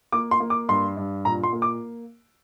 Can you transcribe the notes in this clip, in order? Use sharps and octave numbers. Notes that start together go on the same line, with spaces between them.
A#3 D6
C6
A#3
D6
G2 C6
G2
A#2 A#5
C6
A#3
D6